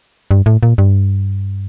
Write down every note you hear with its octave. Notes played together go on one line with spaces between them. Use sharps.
G2
A2
A#2
G2